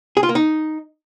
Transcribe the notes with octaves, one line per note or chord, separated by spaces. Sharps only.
G#4
F4
A#3
D#4